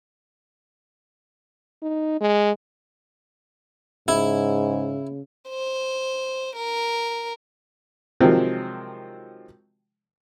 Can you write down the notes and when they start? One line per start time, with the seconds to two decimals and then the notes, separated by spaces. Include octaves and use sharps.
1.82 D#4
2.21 G#3
4.08 G#2 C#3 E4
5.49 C5
6.55 A#4
8.20 C3 D#3 F3 F#3 G#3 C4